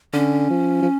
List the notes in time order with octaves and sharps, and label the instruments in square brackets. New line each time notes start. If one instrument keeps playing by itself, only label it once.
[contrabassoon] D3 [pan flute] C#4
[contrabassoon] F3
F3